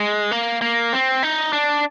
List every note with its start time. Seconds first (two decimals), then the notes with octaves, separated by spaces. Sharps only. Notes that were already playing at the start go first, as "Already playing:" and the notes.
Already playing: G#3
0.31 A#3
0.61 A#3
0.93 C4
1.23 D#4
1.53 D4